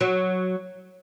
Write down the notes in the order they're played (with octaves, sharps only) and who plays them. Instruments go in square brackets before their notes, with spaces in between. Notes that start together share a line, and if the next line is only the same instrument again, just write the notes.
[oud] F#3